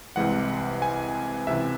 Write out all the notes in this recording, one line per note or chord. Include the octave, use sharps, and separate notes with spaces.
C2 C3 E3 G#3 F#5
G#5
C#2 C3 E3 E5